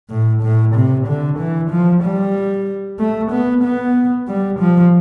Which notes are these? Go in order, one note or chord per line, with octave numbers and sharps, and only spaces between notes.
A2
A2
C3
D3
E3
F3
G3
A3
B3
B3
G3
F3